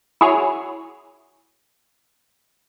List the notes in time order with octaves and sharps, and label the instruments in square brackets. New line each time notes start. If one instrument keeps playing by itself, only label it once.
[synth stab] E4 F#4 G#4 C#5